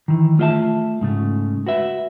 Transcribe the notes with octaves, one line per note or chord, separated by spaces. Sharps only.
D#3 E3
A3 F4 G#4 D#5 E5 A5
G#2 C#3 A3
F#4 B4 E5